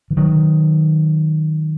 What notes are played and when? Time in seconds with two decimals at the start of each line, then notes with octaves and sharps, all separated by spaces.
0.11 E3
0.17 D#3 F#3